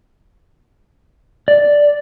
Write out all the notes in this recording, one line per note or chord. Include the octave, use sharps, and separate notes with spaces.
D5